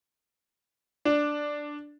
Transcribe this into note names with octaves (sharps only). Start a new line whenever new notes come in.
D4